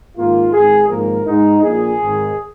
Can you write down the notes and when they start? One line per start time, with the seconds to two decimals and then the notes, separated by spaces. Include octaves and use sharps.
0.17 G#2 D#3 A#3 F4
0.53 G#1 G#2 D#3 G#4
0.90 G#1 G#2 F3 A#3 A#4
1.26 G#2 G#3 D#4
1.63 A#1 A#2 A#3 G#4
2.00 G#1 G#2 D#3